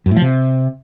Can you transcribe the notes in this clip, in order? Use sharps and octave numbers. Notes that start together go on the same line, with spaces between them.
F#2
A2
F3
C3